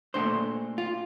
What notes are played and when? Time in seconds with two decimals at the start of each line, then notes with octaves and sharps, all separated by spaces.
0.14 A#2 A3 D4 C5
0.78 F4